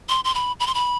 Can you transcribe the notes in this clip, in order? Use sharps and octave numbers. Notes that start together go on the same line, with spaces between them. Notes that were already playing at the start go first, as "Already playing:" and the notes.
C6
C6
B5
B5
C6
B5